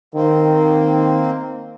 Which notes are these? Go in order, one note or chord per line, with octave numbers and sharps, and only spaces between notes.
D#3 A#3 C4